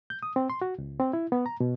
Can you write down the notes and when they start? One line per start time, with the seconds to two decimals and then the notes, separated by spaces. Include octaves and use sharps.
0.10 G6
0.23 D#6
0.36 C4
0.50 C6
0.61 F#4
0.78 C#2
1.00 C4
1.13 E4
1.32 B3
1.46 A#5
1.60 B2